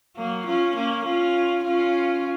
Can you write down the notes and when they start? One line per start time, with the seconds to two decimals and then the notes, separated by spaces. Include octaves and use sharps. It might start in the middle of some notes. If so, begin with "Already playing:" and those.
0.17 F#3 A#3
0.46 C#4 F4
0.76 A#3 C#4
1.05 C#4 F4
1.64 C#4 F4